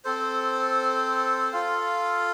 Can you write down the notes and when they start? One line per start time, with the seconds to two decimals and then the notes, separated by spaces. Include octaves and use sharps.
0.05 C4 A4 C5
1.53 F4 A4 F5